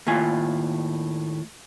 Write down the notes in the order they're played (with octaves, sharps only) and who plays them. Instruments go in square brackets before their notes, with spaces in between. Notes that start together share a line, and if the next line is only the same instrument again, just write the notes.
[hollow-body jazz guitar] D#2 A2 F4 G#5